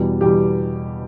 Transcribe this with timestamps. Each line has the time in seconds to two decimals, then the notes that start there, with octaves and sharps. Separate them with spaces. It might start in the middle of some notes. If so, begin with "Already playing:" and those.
Already playing: E2 B2 G3
0.21 E2 B2 G3 G4